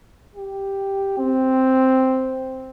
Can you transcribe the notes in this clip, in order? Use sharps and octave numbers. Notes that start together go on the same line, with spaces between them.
G4
C4